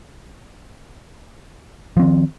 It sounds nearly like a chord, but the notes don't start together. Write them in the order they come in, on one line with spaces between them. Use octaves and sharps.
F3 C4 D#3